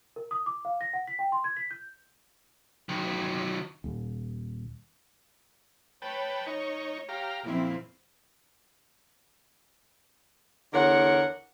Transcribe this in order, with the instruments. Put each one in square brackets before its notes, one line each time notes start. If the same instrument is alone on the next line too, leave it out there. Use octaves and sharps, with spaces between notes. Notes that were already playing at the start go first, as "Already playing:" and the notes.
[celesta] A#4
D#6
D6
F5
A#6
F#5
B6
G5
C6
G#6
B6
G6
[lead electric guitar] D#3 F#3
[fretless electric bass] D#1
[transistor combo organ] B4 G5 A5 [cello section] C#5
[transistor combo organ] D#4 C#6
G4 F5 A#5
[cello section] F2 C4 E4 [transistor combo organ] A#2
[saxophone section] E2 D3 A#4 C#5 F#5